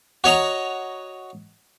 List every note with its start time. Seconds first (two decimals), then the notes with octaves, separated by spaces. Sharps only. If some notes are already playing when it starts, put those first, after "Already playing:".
0.24 F#4 C#5 D#5 A#5